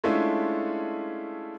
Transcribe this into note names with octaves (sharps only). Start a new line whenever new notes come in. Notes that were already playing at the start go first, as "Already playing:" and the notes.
G#3 A3 C#4 D4 E4 F4